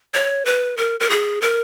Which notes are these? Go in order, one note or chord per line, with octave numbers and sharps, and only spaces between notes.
C#5
B4
A#4
A#4
G#4
A#4